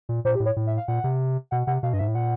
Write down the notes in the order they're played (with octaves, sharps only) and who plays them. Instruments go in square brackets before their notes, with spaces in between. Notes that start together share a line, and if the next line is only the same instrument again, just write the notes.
[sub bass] A#2
[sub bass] A#2 [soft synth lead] C5
[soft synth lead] G4
[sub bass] A2
[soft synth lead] C#5
[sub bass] A2
[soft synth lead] E5
F5
[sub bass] A#2 [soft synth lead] F#5
[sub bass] C3
[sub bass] B2 [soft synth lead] F#5
[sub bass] C3 [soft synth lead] F#5
[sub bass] B2 [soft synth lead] F5
[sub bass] G2 [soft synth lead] D#5
[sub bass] G#2 [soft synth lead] E5
[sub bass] A2
[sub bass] A#2 [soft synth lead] F#5